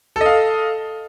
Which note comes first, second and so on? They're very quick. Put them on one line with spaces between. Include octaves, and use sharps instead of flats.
A4 D#5 F5